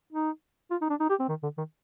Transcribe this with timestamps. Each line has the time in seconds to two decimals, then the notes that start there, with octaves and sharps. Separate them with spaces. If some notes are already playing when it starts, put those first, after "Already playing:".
0.13 D#4
0.71 F4
0.81 D#4
0.90 D4
1.00 D#4
1.10 G4
1.19 C4
1.29 D#3
1.43 D3
1.58 D#3